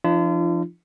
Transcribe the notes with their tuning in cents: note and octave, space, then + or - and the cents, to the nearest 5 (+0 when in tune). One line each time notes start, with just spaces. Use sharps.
F3 -25 D4 +25 F4 -40